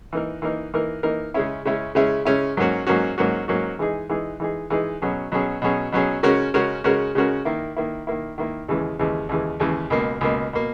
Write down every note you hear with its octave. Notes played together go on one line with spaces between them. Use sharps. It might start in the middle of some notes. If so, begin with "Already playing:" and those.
E3 A#3 D#4 A#4
E3 A#3 D#4 A#4
E3 A#3 D#4 A#4
E3 A#3 D#4 A#4
C#3 G#3 C#4 E4
C#3 G#3 C#4 E4
C#3 G#3 C#4 E4
C#3 G#3 C#4 E4
G#2 F#3 A#3 C#4 F#4
G#2 F#3 A#3 C#4 F#4
G#2 F#3 A#3 C#4 F#4
G#2 F#3 A#3 C#4 F#4
E3 G#3 D#4 G#4
E3 G#3 D#4 G#4
E3 G#3 D#4 G#4
E3 G#3 D#4 G#4
B2 F#3 C#4 G#4
B2 F#3 C#4 G#4
B2 F#3 C#4 G#4
B2 F#3 C#4 G#4
C#3 G#3 C#4 F#4 A#4
C#3 G#3 C#4 F#4 A#4
C#3 G#3 C#4 F#4 A#4
C#3 G#3 C#4 F#4 A#4
D#3 A#3 E4
D#3 A#3 E4
D#3 A#3 E4
D#3 A#3 E4
D#2 C#3 E3 G#3
D#2 C#3 E3 G#3
D#2 C#3 E3 G#3
D#2 C#3 E3 G#3
C#2 B2 A#3
C#2 B2 A#3
B2 A#3